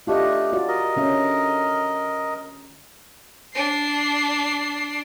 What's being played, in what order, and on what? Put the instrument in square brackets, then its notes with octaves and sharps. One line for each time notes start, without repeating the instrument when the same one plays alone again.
[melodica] A3 D4 [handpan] F4 G4 D#5
[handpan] F4 F#4 D5
[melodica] A#4 D#5
[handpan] D3 C#4 E5
[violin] D4 C7